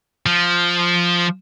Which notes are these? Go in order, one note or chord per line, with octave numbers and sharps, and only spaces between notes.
F3